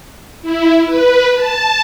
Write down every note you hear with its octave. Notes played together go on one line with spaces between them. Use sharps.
E4
B4
A5